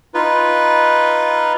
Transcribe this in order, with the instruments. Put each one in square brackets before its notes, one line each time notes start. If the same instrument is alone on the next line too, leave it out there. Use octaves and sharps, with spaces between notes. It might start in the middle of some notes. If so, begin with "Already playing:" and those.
[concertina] D#4 F4 B4